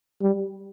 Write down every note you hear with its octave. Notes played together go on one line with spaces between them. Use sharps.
G3